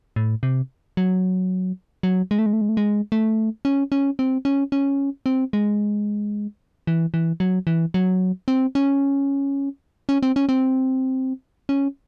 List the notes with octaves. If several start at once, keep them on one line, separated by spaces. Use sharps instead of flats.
A2
C3
F#3
F#3
G#3
A3
G#3
A3
G#3
A3
G#3
A3
C#4
C#4
C4
C#4
C#4
C4
G#3
E3
E3
F#3
E3
F#3
C4
C#4
C#4
C4
C#4
C4
C#4